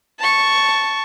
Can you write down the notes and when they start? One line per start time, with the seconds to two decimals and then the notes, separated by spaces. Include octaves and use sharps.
0.19 A5 C#6